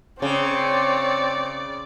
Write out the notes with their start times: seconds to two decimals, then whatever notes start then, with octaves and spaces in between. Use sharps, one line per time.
0.22 C#3 C4 C#5 D5